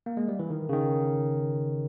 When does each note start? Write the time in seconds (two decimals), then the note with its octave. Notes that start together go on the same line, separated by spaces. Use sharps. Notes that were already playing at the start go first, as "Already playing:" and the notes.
0.06 A#3
0.17 G#3
0.28 G3
0.39 E3
0.50 D#3
0.69 C#3
0.73 D#3